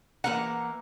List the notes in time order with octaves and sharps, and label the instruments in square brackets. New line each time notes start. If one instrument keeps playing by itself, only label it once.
[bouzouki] E3 A#3 A#5 [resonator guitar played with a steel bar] F#5